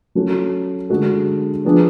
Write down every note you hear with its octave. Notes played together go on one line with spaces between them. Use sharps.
F#3 C#4 F#4 A4
D3 G#3 D4 F#4 A4
F3 B3 D4 G#4